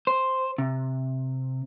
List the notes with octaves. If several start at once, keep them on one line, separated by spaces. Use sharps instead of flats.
C5
C3